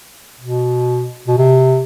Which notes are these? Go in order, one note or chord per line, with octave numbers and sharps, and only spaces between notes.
B2
B2
C3